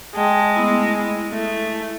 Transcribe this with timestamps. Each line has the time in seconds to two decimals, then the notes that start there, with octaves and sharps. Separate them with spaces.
0.15 G#3 G5 A5
0.56 A3 B3 E4
0.87 E4
1.32 A3